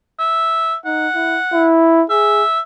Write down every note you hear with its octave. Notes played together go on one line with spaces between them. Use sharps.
E5
D#4 F#5
E4
E4
G#4 E5